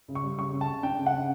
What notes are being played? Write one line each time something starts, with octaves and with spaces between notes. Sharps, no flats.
C#3
C#6
G3
C#3 C#6
C#3
A5
C#3
D4 G5
C#3
F#5
C#3